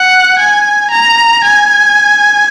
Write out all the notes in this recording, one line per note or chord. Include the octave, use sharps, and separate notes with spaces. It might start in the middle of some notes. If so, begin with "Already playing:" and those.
Already playing: F#5
G#5
A#5
G#5